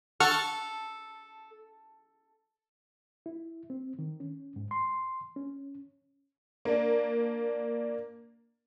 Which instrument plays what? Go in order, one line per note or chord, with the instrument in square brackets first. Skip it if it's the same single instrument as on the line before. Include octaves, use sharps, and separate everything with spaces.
[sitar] A4 [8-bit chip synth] F#5 C#6 F6
[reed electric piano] E4
C4
D#3
C#4
G#2
C6
C#4
[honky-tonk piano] A#3 D4